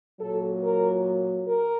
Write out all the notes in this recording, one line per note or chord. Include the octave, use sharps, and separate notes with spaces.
A#2 F#3 A4
A#4
A#4